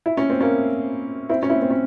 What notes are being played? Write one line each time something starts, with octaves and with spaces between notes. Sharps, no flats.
E4
C#4
C4
A#3 C#4
C4 E4
C#4
C4 E4
C4
C#4